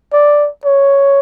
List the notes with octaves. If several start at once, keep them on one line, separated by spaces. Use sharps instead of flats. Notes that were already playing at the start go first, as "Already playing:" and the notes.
D5
C#5